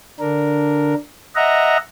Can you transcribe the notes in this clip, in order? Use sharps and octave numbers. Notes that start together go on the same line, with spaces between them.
D3 D4 A#4
D#5 E5 F#5 A#5